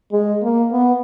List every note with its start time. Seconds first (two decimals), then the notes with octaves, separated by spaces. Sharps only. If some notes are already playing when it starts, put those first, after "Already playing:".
0.12 G#3
0.42 A#3
0.71 B3